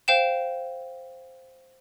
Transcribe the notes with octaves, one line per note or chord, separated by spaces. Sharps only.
C5 F5 G5 E7